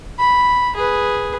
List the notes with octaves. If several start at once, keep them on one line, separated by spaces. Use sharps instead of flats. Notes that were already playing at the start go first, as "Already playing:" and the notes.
B5
G#4 B4